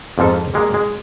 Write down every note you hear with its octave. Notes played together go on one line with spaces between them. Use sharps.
F2 G#2 F3 A4
G3 G#3 A#3
G#3